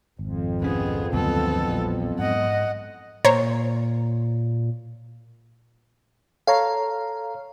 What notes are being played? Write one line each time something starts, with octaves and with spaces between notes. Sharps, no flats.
G#1 F2
C2 B3 C#4 G#4
D2 G2 B2 D#3 F#3 B3 A4
A#1 E2 G3
G#2 D#5 F#5
A#2 C5 C#5 A#5
A4 C#5 F5 A#5